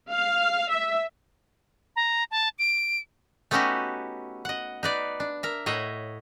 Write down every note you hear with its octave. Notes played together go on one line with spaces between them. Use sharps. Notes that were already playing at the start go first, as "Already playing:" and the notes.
F5
E5
A#5
A5
D7
A3 B3 C#4 D#4 F#4 G4
D#5 F#5
D#4 B4 D5
D4
A#4 E5
A2 C#5 D#5 E5 F#5